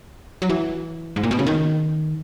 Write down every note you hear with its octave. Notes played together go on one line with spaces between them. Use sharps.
F#3
E3
G#2
A#2
B2
C#3
D#3